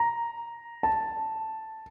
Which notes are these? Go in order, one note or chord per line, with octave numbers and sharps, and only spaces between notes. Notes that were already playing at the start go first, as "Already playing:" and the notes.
Already playing: A#5
A5